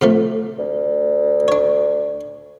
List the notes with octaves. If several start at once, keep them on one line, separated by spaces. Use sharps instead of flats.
C3 F3 A3
D2
D4 C#5